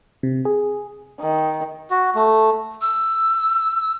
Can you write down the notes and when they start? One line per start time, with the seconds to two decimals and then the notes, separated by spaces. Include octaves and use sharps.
0.23 C3
0.45 G#4
1.20 D#3
1.90 F#4
2.15 A3
2.82 E6